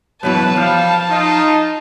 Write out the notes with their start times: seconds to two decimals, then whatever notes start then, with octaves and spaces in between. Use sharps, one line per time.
0.23 F#2 B2 E3 B4 A5
0.56 F3 G3 F5
1.10 D#4 F4